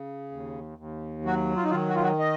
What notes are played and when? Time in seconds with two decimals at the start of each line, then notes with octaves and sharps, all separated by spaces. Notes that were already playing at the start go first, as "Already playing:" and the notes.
Already playing: C#3
0.31 D#2
0.78 D#2
1.25 F#3 F#4
1.57 F4
1.64 D#4
1.70 D#3 F4
1.88 F#4
1.95 F4
2.03 F#4
2.19 D#5